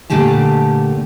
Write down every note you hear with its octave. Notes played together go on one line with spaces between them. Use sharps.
A#2 D3 A3 G4 A5